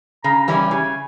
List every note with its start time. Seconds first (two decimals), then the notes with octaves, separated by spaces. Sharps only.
0.24 C#3 A#5
0.48 E3 G3 C#4 E4
0.71 C#3 G#5